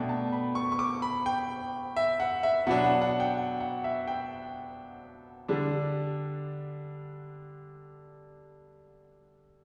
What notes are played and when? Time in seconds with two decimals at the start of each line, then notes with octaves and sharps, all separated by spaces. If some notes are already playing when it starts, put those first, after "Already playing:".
Already playing: B2 A3 D4 G5
0.09 A5
0.32 B5
0.55 C#6
0.72 C#6
0.79 D6
1.02 B5
1.26 G5
1.96 E5
2.20 F#5
2.43 E5
2.67 B2 F#3 B3 D4 F#5
2.84 F#5
3.02 F#5
3.20 G5
3.37 F#5
3.60 F#5
3.84 E5
4.07 G5
5.48 D3 G3 D4